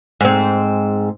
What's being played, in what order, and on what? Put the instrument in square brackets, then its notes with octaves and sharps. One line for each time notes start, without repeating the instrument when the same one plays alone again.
[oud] G#2 C4